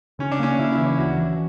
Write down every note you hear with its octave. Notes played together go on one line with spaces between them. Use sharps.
C#3 C#4
D4
A#3 C#4
C#3 E4
E4
E3
D4
D2 F#4
E3